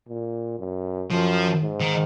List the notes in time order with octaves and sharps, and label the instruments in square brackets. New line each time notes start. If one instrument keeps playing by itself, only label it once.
[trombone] A#2
F#2
[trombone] F#2 [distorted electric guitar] F3
[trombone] G#2
[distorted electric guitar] D#3